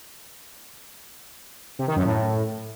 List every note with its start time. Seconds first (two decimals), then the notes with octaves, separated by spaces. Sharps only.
1.79 C3
1.88 D#3
1.96 F#2
2.05 A2